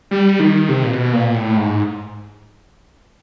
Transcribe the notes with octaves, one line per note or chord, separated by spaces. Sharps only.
G3
D#3
C3
A#2
B2
A#2
A2
G#2